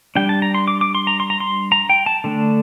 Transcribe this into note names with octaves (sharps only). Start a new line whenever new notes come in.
G3 D4 G5
A5
A#5
C6
D6
D6
C6
A#5
C6
A#5
C6
A#5
G5
A5
D3 A3 D4